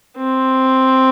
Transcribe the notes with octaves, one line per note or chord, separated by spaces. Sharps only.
C4